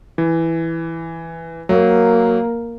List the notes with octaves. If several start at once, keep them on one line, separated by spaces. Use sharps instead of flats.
E3
F#3 A#3